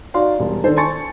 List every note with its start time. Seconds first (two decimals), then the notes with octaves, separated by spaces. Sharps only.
0.14 D#4 F#4 D5 F5 C6
0.39 E1 G3
0.64 D#3 D4 A4 C5
0.76 G#5 A5 C6 C#6 A6 C#7